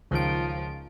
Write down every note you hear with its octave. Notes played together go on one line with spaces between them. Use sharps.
C#2 D#3 F3 D7